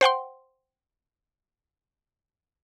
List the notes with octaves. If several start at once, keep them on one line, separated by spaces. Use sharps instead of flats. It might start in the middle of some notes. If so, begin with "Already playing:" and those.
C5 F#5 G5 C6